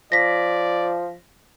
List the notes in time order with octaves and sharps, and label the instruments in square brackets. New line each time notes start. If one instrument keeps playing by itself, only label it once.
[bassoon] F3 [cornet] D5 [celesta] A#6 B6